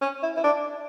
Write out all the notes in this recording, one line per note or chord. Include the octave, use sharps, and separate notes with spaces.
C#4
E4
E4
D4